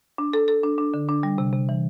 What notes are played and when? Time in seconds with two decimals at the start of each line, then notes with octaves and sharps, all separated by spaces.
0.18 D4
0.33 A4
0.48 A4
0.64 D4
0.78 D4
0.94 D3
1.09 D4
1.23 G3
1.38 C3
1.53 C3
1.69 E3